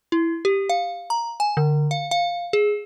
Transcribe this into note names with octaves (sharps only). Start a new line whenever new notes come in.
E4
G4
F5
A#5
G#5
D3
F5
F5
G#4